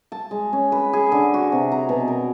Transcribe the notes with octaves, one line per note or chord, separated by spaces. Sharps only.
A5
G#3
C#4
B4
G#4
D3
F#4
C3
A#5
B2
A#4